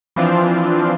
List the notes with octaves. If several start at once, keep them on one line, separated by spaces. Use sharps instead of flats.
E3 F3 C4 D4 F4